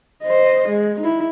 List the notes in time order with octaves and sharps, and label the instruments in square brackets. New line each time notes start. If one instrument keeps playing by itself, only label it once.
[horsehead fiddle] C5 D#5
G#3
D#4 E4